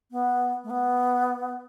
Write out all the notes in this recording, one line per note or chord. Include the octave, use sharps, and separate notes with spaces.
B3
A3
B3